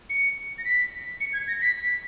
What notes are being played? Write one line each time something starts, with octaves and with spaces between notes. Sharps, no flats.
C#7
A#6
B6
C#7
G#6
A#6
B6